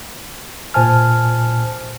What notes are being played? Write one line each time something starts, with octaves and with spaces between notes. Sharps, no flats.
A#2 C5 G#5 A5 F6